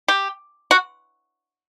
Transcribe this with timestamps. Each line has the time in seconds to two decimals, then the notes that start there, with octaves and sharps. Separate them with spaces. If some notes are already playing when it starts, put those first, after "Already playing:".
0.08 G4
0.71 F#4